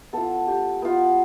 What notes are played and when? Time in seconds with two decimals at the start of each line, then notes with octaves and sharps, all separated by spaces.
0.13 B3 F4 A4
0.47 G4
0.82 B3 F4